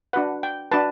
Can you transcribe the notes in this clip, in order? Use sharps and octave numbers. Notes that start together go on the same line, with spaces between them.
D4 F#4 B4 F#5
G5
D4 F#4 B4 A5